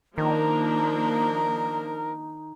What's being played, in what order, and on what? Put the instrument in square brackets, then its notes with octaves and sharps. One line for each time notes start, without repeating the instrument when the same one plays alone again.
[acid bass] D#3 [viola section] F3 A#3 D4 [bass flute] D#4 [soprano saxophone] A#4